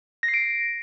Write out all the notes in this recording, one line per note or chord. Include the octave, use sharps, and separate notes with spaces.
A#6
C7
D7